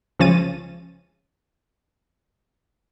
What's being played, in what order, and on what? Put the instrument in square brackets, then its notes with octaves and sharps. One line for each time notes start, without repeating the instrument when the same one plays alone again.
[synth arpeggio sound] C#2 F3 C#4 A6 D#7